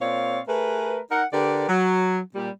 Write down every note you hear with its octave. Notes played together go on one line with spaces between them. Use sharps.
A#2 C4 C#5 D5 F5
A3 G#4 A#4 B4
D#4 A#4 F#5
D3 G4 A#4 B4 D5
F#3
A#2 G3